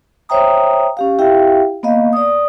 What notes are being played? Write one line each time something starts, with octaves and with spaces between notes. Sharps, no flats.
C5 C#5 E5 G5 A#5 D#6
C#4 G4 F5
E4 G4 E5 F5 G5
A#3 B3 D#5 F5
D5 D#6